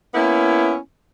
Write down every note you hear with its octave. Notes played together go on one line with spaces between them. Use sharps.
A#3 B3 C#4 E4